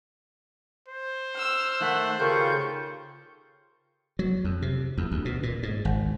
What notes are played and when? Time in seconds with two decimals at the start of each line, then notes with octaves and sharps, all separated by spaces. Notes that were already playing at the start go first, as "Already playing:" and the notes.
0.88 C5
1.35 E6 F6
1.80 D#3 A3 F#5 F#6 B6
2.19 C#3 D#4 F4 G4 A4 A#4 C#6 G6
4.19 F#3
4.44 F2
4.62 C3
4.98 E2
5.12 D2
5.25 B2
5.43 A#2
5.63 G#2
5.85 G#1